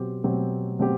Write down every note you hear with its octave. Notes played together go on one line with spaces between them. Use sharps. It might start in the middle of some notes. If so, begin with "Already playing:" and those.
Already playing: B2 F#3 C4 G4
B2 F#3 C4 G4
B2 F#3 C4 G4